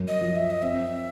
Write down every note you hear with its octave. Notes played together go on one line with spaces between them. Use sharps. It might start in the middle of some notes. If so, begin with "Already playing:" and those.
Already playing: F#2
D#5
F3
E5
D#5
C4 E5